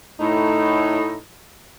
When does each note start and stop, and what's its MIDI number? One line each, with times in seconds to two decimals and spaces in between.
0.20 1.17 45
0.20 1.17 63